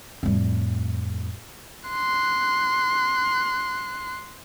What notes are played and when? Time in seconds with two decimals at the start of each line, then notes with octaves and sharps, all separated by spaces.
0.23 F2 A2 G3
1.89 C6 F#6